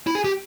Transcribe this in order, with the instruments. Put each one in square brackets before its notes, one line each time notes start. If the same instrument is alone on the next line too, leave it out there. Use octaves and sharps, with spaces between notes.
[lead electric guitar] E4
G#4
G4